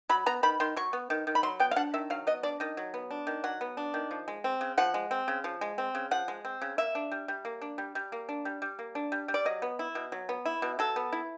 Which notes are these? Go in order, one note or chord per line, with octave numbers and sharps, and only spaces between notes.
F#3 B5
B3 A#5
D#3 B5
D#3 C6
F#3 C#6
B3
D#3
D#3
B5
F#3 C6
B3 G5
F5
D4 F#5
D#3 E5
F#3 F5
B3 D#5
D4 D5
D#3 D#5
F#3
B3
D4
D#3
F#3 F#5
B3
D4
D#3
F3
G#3
C4
C#3
F3 F#5
G#3
C4
C#3
F3
G#3
C4
C#3
F3 F#5
G#3
C4
C#3
A#3 E5
D4
G3
G3
A#3
D4
G3
G3
A#3
D4
G3
G3
A#3
D4
G3
G3
D5
F#3 D#5
B3
E4
B2
F#3
B3
E4
B2
F#3 A4
B3
E4